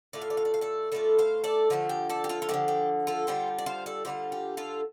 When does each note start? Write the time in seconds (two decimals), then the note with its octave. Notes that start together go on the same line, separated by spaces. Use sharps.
0.13 A2 A3 F4 D5
0.22 F5
0.30 D5
0.37 F5
0.45 D5
0.54 F5
0.61 A4 D5
0.92 A2 A3 F4 A4 D5
1.19 C5 F5
1.44 A4 D5
1.70 D3 F3 A3 F4
1.89 G4
2.10 A4 D5
2.24 G4
2.29 F4 A4
2.42 F4
2.49 D3 F3 A3 G4
2.68 G4
3.07 F4 A4
3.27 D3 G3 F4 G4 C5
3.58 D5
3.66 C5 F5
3.86 A4 D5
4.05 D3 G3 F4 G4 C5
4.32 G4
4.57 F4 A4